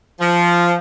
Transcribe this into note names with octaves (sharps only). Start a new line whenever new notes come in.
F3